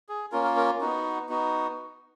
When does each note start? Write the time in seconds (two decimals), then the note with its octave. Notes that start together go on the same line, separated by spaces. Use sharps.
0.09 G#4
0.32 A#3 C#4 F4 A#4
0.44 A#4
0.57 A#4
0.81 B3 D#4 F#4
1.29 B3 D#4 F#4